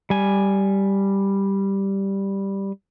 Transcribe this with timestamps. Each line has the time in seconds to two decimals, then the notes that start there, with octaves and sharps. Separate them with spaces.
0.10 G3 G#5